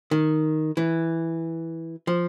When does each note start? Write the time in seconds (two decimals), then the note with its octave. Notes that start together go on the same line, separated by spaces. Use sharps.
0.11 D#3
0.77 E3
2.07 F3